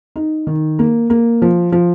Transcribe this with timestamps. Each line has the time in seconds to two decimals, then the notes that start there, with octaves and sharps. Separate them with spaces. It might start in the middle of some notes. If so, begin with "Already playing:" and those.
0.16 D#4
0.47 D#3
0.79 A#3
1.10 A#3
1.42 F3
1.72 F3